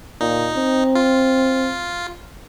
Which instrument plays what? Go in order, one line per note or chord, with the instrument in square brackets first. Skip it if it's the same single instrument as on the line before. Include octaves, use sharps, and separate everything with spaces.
[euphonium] A#2 [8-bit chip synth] D#4
[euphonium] C4
[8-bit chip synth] F4